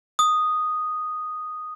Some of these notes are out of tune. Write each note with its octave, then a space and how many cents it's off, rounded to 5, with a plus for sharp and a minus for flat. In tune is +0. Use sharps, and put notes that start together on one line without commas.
D#6 -5